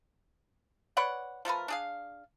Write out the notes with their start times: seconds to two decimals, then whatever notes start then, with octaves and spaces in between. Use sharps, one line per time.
0.97 B4 C#5 D5 F#5
1.45 F3 A3 A#4 B4
1.68 D4 G#4 F5